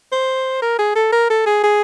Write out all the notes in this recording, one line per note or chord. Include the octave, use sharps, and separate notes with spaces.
C5
A#4
G#4
A4
A#4
A4
G#4
G#4